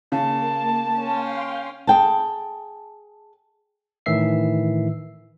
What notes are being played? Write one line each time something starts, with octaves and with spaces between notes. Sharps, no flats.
C#3 A#3 A5
C#4 F5 G5 C6
G#4 G5 A5
A2 D#3 E3 E5 C7